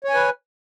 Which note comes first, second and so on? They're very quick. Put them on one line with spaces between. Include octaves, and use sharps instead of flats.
C#5 G#5 B4